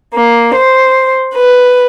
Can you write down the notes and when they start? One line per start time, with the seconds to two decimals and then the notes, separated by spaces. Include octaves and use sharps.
0.15 A#3
0.56 C5
1.34 B4